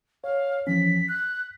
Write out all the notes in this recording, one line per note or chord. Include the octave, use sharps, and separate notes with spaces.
C#5 F5
E3 F3 C#4 B6
F#6 B6